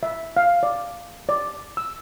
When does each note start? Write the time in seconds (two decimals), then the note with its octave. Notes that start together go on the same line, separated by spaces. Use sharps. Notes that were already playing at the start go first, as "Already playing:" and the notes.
0.03 E5
0.37 F5
0.63 D5
1.29 D5
1.77 E6